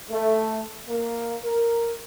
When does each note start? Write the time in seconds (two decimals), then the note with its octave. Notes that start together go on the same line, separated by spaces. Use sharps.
0.10 A3
0.87 A#3
1.42 A#4